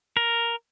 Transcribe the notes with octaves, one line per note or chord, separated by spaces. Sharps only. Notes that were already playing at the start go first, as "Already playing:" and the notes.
A#4